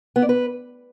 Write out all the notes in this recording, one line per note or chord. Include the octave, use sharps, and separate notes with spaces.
B3
D5
B4